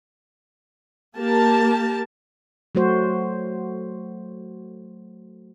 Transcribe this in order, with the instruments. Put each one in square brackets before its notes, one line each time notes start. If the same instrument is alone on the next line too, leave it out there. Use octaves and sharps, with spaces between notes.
[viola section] A#3 G4 A#4 A5
[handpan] F#3 A3 F#4 C5